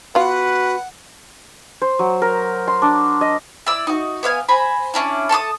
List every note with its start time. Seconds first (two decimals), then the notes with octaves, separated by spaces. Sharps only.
0.15 B3 F4 F#4 B4 F#5
1.82 C5
1.99 F#3
2.22 A#4
2.67 C6
2.82 D4
3.21 D#5
3.67 E4 D5 E6
3.87 D#4 F#4
4.23 B3 E5 F5 G#5
4.48 C5 G#5 A#5 B5
4.94 C#4 D4 E4
5.29 A4 A5 C#6 D#6